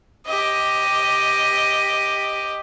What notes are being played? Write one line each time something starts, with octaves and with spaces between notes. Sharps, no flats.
G4 D#5